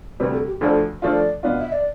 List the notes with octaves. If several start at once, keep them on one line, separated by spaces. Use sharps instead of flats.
D2 C3 G3 B4
A4
G4
D2 D3 F3 A3 D4 A4
D3 F3 A3 D4 F4 D5
B2 B3 D4 F4
E5
D5